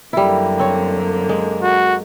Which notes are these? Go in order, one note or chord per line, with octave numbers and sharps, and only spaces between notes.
F#2 D3 G3 A#3 E4
C4 C#5
G#3
F#4